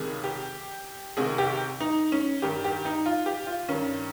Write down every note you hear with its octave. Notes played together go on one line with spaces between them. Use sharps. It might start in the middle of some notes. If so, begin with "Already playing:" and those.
Already playing: C#2 C3 D#3 G#4
G4
C2 C3 D#3 G#4
G4
D#4
C#4
G2 D#3 G4
G4
D#4
F4
G4
F4
G2 D#3 C#4